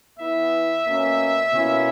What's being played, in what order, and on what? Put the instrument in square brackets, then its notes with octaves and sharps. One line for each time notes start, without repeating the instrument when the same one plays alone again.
[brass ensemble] E3 B3 E4 E5
B2 A#3 C#4
B2 A#3 C#4 E4